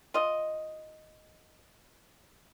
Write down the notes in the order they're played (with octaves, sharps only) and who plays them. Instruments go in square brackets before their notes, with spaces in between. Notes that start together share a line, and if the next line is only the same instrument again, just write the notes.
[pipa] F4 D#5